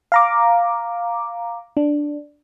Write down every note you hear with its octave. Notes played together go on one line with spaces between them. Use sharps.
F5 A#5 D6
D4